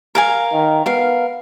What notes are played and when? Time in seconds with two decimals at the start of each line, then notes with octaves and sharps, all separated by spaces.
0.15 A#4 F5 G#5
0.53 D#3
0.86 B3 A#4 F5